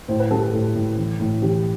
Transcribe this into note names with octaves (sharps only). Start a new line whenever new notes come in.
A2 C5
B4
G3 A4
A4
A2 A4
A2
E3
A2
E3 G4